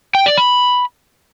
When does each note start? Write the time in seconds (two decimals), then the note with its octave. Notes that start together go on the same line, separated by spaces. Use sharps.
0.15 G5
0.26 D5
0.37 B5